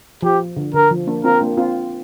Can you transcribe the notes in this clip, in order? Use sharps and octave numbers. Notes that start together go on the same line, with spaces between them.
F3 G4
D3
D3 A#4
F3
A#3 D4
C4 F4 A#4
A#3 D4
C4 F4